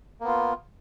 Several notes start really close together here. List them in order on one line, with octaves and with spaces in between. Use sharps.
A#3 B3 F4